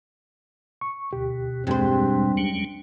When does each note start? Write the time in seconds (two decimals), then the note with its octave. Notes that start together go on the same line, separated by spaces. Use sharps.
0.81 C#6
1.13 D2 B2 G4
1.67 E2 G2 B2 G#3 C4 C5
2.37 F#3 G3 C#4